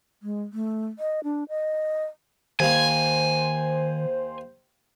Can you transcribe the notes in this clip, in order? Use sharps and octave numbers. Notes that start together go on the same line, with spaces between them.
G#3
A3
D#5
D4
D#5
D#2 D#3 A#3 C5 G#5